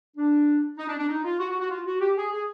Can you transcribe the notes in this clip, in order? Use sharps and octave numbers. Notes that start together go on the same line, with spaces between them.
D4
D#4
D4
D4
D#4
F4
F#4
F#4
F#4
F4
F#4
G4
G#4
G#4